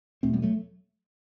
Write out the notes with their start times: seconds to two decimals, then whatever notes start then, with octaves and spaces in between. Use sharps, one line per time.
0.23 E2 B2 A3 C4
0.33 G3 B3
0.42 F#3 A3